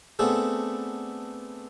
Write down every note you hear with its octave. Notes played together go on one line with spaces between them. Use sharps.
A3 B3 C4 D4 G#4 A4